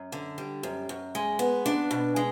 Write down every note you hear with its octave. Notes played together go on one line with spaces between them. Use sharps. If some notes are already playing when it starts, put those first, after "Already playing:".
Already playing: F#2
D3
G3
F#2
F#2
G#3
B3
D4
B2
G#3